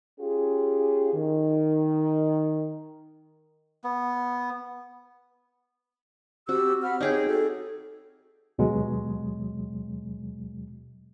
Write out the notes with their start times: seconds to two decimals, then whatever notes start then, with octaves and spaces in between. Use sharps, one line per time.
0.20 C#4 F4 G4 G#4
1.14 D#3
3.84 B3
6.49 C4 F#4 G4 E6
6.83 F#5 B5 F6
7.01 D#4 G4 G#4 C#5 G5
7.28 F#4 A4
8.58 D#2 B2 F#3 G#3